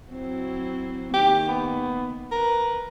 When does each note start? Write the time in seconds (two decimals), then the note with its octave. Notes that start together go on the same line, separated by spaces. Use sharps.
0.10 F#3 C4 E4
1.14 D#3 A#3 G4
1.48 B3
2.32 A#4 B4